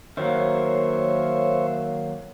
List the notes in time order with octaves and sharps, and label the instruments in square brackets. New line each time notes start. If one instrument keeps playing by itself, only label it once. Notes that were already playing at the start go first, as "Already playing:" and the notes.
[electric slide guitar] D#3 F#3 A#3 [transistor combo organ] C5 C#5 E5